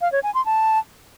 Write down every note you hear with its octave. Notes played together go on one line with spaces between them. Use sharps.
F5
C#5
G#5
C6
A5